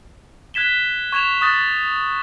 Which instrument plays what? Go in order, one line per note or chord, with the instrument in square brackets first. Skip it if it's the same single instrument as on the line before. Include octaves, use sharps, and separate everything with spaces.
[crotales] F#6 G#6 B6 E7 G7
C#6 G#6 E7 F7
C#6 D#6 F#6 A6